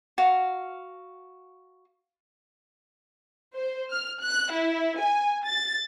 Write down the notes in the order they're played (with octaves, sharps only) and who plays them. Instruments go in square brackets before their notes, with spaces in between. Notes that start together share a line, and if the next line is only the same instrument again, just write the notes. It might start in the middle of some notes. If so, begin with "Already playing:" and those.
[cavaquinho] F#4 F5
[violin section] C5
F6
F#6
E4
G#5
A6